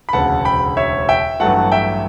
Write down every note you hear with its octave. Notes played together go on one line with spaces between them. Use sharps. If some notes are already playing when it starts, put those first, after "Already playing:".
B5
E1 D2 C#3 F#5 A5
G5 B5
C#5 E5
E5 G5
A1 G2 F#3 A3 F#5 A5
E5 G5